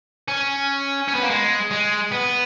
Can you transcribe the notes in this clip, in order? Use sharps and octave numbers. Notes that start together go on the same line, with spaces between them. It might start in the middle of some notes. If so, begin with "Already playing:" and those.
C#4
C#4
B3
A#3
G#3
G#3
B3